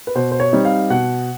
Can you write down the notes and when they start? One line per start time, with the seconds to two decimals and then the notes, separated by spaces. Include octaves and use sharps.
0.07 B4
0.15 B2 C5
0.32 C5
0.40 C#5
0.53 G3 C4 D#4
0.65 F5
0.90 B2 F#5